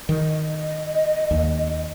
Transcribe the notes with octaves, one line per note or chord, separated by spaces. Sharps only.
D#3 D#5
D#2